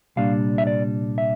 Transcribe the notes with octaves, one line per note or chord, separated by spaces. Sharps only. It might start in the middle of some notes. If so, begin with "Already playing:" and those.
C2 A#2 G3 D4 F5
E5
D5
E5